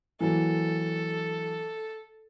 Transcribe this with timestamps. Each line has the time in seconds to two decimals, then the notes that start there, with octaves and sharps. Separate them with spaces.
0.21 E3 F#3 A#3 A4